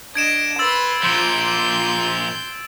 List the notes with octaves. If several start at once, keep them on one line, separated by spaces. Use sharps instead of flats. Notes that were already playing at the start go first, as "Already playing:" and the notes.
D4 D#5 G#6 D7 E7
B4 C6 E6 A6
A#2 F3 C6 G6